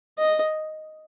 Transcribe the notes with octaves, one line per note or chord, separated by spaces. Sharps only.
D#5